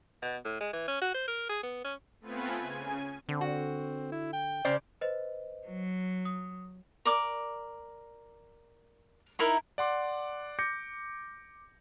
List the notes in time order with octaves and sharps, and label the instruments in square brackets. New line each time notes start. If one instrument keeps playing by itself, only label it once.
[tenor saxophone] B2
A2
G#3
E3
C#4
F#4
C5
A#4
G#4
B3
C#4
[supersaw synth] A3 B3 C4 F4 B4 G#5
C#3 G#5
[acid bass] D3 [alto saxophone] C4
[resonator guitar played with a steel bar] F#4
[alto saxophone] E4
G5
[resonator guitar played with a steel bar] C#3 C5 D5
[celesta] B4 C5 D#5
[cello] F#3
[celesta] D#6
[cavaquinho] A#4 D5 D6
D#4 E4 A#4 E5
[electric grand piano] D5 F#5 C6 D6
D6 G6 A#6 C#7